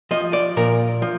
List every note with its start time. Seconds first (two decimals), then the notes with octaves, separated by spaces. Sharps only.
0.11 F3 D#5
0.33 D5
0.57 A#2 A#4
1.02 F3